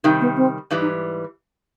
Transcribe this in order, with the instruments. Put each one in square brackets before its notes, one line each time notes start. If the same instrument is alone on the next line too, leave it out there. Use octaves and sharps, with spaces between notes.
[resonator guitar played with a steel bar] C3 D#3 G3 [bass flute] D#4
[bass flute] B3
C4
[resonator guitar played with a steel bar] G#2 E3 G3
[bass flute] D#4